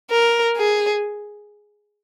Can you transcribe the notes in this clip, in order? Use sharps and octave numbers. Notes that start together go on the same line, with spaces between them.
A#4
G#4